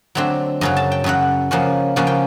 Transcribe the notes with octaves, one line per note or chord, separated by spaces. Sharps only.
D3 F#3 A3 C4
F#2 C#3 F#3 A#5
A5
G5
F#2 C#3 F#3 F#5
C#3 F3 A#3 C#4 F#5
C#3 F3 A#3 C#4 F#5
G5